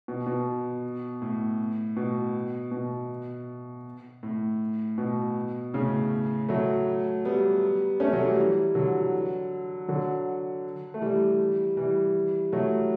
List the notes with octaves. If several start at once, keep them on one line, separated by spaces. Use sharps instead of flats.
B2
B2
A2
B2
B2
A2
B2
A2 C#3
F#3 A3
G3 B3
A3 C#4
F#3 A3
E3 G3
D3 F#3
D3 F#3
A3
E3 G3
E3 G3
F#3 A3